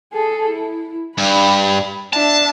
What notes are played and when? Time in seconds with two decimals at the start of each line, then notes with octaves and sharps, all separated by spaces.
0.13 G#4 A4
0.50 E4
1.18 G2 B5
2.13 D4 E5 A5